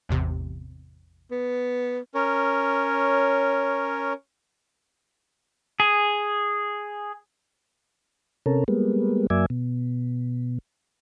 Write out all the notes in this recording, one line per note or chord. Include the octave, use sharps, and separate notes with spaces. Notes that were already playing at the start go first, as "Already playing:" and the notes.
A1 E2 C3
B3
C#4 A#4 C#5
G#4
C3 C#4 A4 A#4
G3 G#3 A#3 B3
F#2 F#3 A#3 D5 E5 G#5
B2